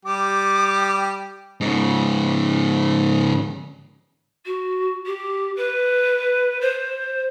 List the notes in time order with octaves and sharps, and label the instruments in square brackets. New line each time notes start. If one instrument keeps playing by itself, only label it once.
[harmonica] G3 G4 [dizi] D6
[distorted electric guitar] G#2 C#3
[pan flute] F#4
G4
B4
C5